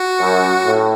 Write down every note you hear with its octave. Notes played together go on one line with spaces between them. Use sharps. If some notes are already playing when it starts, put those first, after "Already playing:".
Already playing: F#4
F#2
A2